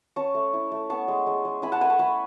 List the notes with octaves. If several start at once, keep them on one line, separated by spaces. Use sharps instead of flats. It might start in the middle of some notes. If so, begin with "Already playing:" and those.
C#4 A5 C#6
A3
E4
A3
B3 A5 C#6
G#3
G#3
G#3
E4 G#5 B5
F#5 A5
A3 G#5 B5
A5 C#6
A3 G#5 B5